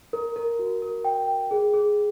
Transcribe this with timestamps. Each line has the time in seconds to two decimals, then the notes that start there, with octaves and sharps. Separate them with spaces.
0.13 A#4
0.36 A#4
0.59 F#4
0.82 A#4
1.05 G5
1.28 G5
1.51 G#4
1.74 G#4